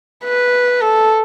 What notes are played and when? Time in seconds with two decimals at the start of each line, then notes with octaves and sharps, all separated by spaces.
0.25 B4
0.81 A4